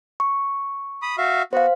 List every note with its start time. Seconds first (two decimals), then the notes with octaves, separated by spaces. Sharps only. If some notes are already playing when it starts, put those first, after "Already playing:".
0.20 C#6
1.02 B5 D#6
1.18 F#4 E5 F5
1.53 B3 F#4 C5 F5